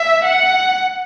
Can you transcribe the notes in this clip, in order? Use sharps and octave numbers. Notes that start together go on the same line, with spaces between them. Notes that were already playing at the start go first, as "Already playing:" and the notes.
Already playing: E5
F#5